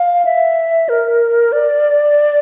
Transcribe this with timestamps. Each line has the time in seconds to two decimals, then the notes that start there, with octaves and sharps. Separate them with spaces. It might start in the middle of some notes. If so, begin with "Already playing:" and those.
Already playing: F5
0.25 E5
0.89 A#4
1.52 D5